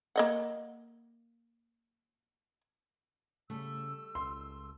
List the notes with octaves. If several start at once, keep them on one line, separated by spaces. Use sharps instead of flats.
A#3 D#5 F#5
C#3 G3 A3 E6
C#2 C6